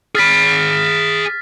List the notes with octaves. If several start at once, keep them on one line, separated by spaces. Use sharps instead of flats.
G#4 B5 F6 A6 B6